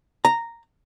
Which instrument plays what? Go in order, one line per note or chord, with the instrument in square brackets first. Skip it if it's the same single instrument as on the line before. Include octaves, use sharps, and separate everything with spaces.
[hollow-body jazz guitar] A#5